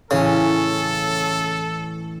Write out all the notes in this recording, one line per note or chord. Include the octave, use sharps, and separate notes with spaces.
A2 C#3 E3 C#4 A4